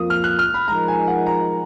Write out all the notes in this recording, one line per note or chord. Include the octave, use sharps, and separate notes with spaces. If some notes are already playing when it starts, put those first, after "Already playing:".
Already playing: F2 F3 A#3 F4 D#6
F6
F#6
F6
B5
F3 G#3 D#4 A#4 A#5
G#5
F#5
A#5